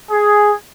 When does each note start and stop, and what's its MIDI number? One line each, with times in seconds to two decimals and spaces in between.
0.11 0.52 68